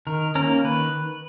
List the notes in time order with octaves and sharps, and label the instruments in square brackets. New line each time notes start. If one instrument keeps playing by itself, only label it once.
[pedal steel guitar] D#3 A#4
A#3 C#4 A#4
D#3 B4